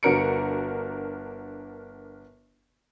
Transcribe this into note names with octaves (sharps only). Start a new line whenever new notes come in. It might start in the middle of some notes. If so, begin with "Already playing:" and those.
G1 D4 F#4 A#4 C#7 D7